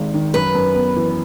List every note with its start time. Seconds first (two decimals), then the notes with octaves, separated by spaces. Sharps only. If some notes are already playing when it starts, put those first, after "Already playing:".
Already playing: G#1 G#2 D#3
0.14 D#3
0.34 F#2 B4
0.55 F#2
0.75 B3
0.96 E3